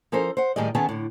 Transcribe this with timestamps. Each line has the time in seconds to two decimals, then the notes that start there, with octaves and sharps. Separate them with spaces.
0.12 F3 C#4 A4 A#4 C5
0.37 C5 F#5
0.56 A2 D#3 G3 G#4 D5 D#5
0.75 D#3 B3 C#4 G#4 A5
0.89 A2 D3